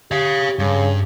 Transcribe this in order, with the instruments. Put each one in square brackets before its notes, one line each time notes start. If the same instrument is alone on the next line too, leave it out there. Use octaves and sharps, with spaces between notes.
[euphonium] G4 [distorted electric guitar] C#5 F5
[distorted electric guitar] G2 [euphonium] C#3